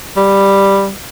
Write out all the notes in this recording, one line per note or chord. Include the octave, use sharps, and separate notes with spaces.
G3